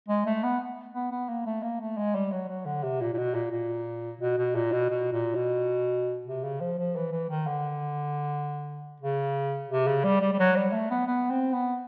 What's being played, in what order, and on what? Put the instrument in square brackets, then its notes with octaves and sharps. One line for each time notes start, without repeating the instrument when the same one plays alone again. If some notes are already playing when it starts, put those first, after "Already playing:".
[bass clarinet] G#3
A3
B3
B3
B3
A#3
A3
A#3
A3
G#3
G3
F#3
F#3
D3
C3
A#2
A#2
B2
A#2
A#2
B2
B2
A#2
B2
B2
A#2
B2
C3
C#3
F3
F3
E3
E3
D#3
D3
C#3
C3
C#3
G3
G3
G3
F#3
G3
A3
B3
B3
C4
B3